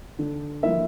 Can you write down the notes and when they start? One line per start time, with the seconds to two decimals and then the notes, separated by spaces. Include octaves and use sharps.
0.19 D3
0.63 F3 A#3 E4 E5